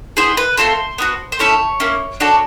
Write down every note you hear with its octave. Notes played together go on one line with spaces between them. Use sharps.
B3 E4 G#4 C5
B4
A3 C4 F4 A4 C5
B3 D4 F#4
C5
A3 C#4 E4 A4 C#5
A#3 C#4 E4
D4 F#4 A4 C#5